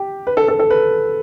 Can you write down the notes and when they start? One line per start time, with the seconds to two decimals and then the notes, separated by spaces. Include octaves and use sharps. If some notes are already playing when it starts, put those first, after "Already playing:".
Already playing: G4
0.27 B4
0.37 A4
0.48 A4
0.59 A4
0.70 B4